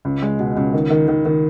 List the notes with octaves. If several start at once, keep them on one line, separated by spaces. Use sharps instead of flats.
C#2
G#3
B2
C#2
D#3
D#3
D#3
D#3